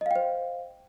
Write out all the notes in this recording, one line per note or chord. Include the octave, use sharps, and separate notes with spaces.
C5 D#5 F5 G5